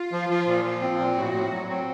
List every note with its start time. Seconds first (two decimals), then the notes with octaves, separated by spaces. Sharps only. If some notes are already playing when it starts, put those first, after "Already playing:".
Already playing: F4
0.12 F3
0.29 F3
0.47 A#2
0.64 F3
0.82 C4
0.99 A#2
1.16 A2 F#4
1.34 A2
1.51 F#3
1.69 C4